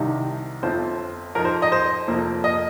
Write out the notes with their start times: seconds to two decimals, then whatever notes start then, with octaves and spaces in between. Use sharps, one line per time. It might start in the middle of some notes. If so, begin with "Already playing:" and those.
Already playing: C2 C3 D#3 G3 D#4
0.63 G1 F2 F3 C4 F4 C5
1.35 F2 F3 D#4 A#4
1.45 C5
1.62 D#5
1.72 C5
2.07 F1 F2 F3 A#3
2.44 D#5